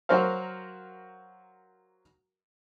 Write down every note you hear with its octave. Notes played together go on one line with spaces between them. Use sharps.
F#3 F#4 A#4 C5 F5